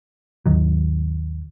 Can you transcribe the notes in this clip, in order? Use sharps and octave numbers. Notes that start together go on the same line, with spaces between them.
G#1 D#2 D#3 F#3